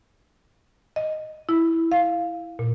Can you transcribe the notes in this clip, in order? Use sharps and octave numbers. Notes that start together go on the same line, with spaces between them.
D#5
E4
F5
A#2